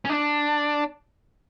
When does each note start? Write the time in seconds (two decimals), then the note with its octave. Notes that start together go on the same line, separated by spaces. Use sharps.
0.05 C#4
0.10 D4